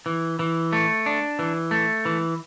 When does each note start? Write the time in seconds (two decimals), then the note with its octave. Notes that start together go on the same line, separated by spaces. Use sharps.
0.06 E3
0.39 E3
0.73 A3
1.06 D4
1.39 E3
1.71 A3
2.05 E3